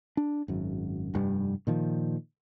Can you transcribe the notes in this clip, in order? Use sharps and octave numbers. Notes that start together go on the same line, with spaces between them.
D4
G#1 F#2
F1 G2 G3
A#2 D#3 F3